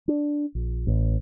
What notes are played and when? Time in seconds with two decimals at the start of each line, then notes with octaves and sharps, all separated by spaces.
0.08 D4
0.55 A#1
0.87 A1